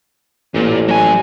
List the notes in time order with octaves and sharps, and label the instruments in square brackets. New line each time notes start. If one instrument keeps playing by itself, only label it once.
[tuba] A1 [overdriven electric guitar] A#2
[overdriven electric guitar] F#3 G#5